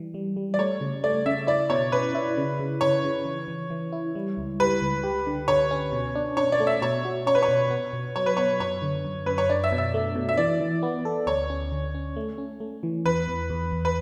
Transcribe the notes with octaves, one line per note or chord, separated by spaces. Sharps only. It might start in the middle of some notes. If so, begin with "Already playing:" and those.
Already playing: E3 G3
G3
G3
D5
A3 C#5
C#3
A3 D5
C#3 E5
E4 D5
B2 C#5
C#4 B4
E4
C#3
C#3
C#3 C#5
C#3
E3
E3
E3
E4
G3
C#2
G3 B4
C#2
G4
D3
D3 C#5
C#4
B2
D4
D4 C#5
D5
A3
E5
B2 C#5
F#4
C#4 C#5
B4
C#5
B2
B3
B2
F#3 C#5
B4
B3 C#5
F#2 C#5
D3
F#2
F#2 B4
C#5
D4 D5
E5
B2
E5
A3
B2
E5
E3 D5
E3
B3
A4
D2 C#5
C#4
D3
C#4
A3
C#4
A3
E3
E2 B4
E2
E2
E2
B4